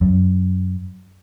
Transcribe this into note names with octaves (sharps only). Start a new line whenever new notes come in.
F#2